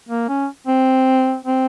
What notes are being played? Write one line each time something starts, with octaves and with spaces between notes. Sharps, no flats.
A#3
C#4
C4
C4